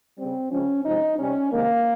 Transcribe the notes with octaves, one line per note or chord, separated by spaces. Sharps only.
C#3 G3 C4
C#3 F3 G#3 C#4
C3 F3 G#3 D#4
C3 G3 C#4
C3 D#3 G#3 A#3